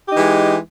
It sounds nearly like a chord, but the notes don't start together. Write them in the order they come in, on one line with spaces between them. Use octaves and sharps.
G4 D#4 E3 G#3